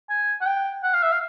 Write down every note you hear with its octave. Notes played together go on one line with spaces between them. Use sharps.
G#5
F#5
G5
F#5
F5
E5
F5